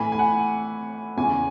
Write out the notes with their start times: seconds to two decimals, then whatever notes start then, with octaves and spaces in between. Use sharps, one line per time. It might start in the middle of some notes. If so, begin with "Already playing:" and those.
Already playing: A2 E3 G#5 B5
0.12 G#5
0.19 F#5
1.17 E2 C#3 E3 G#5